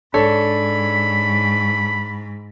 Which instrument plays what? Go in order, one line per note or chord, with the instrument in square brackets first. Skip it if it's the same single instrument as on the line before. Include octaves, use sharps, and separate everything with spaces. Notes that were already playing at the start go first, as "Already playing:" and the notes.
[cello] G#2 [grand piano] D4 A4 C#5 [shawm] B5